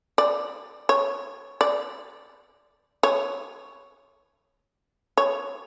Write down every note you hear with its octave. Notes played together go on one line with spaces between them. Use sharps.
D5
C#5
D5
C#5
C#5